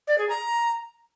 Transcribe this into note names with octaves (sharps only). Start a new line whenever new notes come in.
D5
G#4
A#5